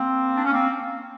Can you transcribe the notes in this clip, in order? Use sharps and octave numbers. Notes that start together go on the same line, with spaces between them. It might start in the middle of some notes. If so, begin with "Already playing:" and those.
Already playing: A#3 C4
D4
C#4
A#3 C4